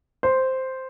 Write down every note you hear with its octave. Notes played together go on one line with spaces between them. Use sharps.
C5